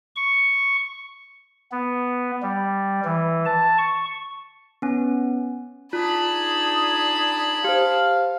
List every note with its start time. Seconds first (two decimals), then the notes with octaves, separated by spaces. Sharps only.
0.16 C#6
1.72 B3
2.42 G3
3.05 E3
3.46 A5
3.78 C#6
4.82 B3 C#4
5.93 D4 D#4 F4 G#4 A5 B5
7.64 G4 C5 F5